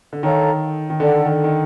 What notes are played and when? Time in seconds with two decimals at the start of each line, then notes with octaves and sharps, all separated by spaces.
0.13 D3
0.23 D#3 A4 C#5 F5 A#5
0.90 D#3
1.00 D3 A4 D5 F#5
1.25 D#3
1.44 D#3